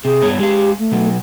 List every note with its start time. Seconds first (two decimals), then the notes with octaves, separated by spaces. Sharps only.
0.05 C3 G#4
0.22 G2 B3 C#5
0.39 G#3 G4 F5
0.79 A3
0.92 B2 F#3